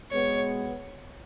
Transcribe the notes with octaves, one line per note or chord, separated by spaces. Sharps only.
B2 G#3 B3 C#5